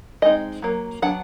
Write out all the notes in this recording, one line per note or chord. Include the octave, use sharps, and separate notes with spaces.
G#3 C4 D#4 D#5
F#3 A#3
F#3 B3 D4 F#5